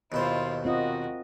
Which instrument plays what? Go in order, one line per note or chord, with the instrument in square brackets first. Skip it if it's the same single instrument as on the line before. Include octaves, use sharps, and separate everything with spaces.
[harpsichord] D#2 B2 C5 [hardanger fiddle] E4 F4
[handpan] C4 F4 D#5 [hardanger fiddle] F#4 A#4